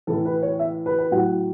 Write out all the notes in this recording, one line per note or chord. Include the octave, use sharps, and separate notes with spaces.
A2 E3 A4
B4
C#5
E5
B4
B4
A2 F#3 F#5